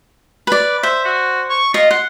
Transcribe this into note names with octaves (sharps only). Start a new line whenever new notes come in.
B4 D5
C5 E5
F#4
C#6
F4 D#5
F#5 C6